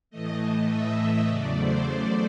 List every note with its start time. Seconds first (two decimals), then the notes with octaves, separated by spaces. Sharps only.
0.10 A2 E3 A3 D#5
0.68 E5
1.27 E2 C#3 F#3 A3 D5
1.56 C5
1.85 C5